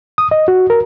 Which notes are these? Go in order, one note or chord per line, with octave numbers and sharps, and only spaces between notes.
D#6
D#5
F#4
A#4